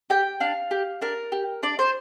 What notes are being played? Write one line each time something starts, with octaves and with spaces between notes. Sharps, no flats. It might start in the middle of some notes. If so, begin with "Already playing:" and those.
G4 G5
D4 F5
G4
D4 A#4
G4
D4 D5
C5